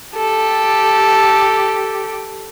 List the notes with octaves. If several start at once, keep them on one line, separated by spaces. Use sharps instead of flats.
G4 A4